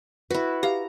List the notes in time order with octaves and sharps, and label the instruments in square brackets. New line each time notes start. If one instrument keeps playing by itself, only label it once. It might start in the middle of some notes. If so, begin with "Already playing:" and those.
[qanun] E4 F#4 [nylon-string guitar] B4
[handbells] G4 F5 [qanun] A#5